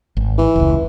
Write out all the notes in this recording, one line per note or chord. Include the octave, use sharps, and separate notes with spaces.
G#1
E3
F1 C#2